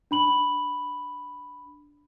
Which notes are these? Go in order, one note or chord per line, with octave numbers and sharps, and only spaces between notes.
D4 B5 F#7